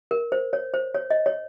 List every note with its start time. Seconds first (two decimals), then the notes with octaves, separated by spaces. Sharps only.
0.11 A#4
0.32 C5
0.53 C#5
0.74 C5
0.94 C#5
1.10 D#5
1.26 C#5